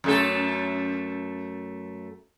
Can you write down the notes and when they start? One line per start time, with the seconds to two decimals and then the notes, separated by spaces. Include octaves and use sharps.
0.04 F#2 A3 A4